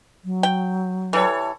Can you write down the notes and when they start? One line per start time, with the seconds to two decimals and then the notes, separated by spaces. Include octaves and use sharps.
0.25 F#3
0.43 G5
1.13 E3 G3 A4 C#5